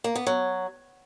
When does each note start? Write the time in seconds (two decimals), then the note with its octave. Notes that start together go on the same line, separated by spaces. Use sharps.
0.04 A#3
0.15 B3
0.27 F#3